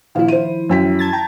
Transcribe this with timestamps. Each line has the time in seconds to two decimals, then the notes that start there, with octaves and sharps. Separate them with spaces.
0.15 A#1 D#3 F3 E4 F5
0.28 C5 D#7
0.69 F#2 G5 B6
0.99 A5 G#6 A6
1.13 G5 A#5